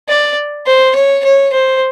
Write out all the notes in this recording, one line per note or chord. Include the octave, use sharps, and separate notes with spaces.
D5
C5
C#5
C#5
C5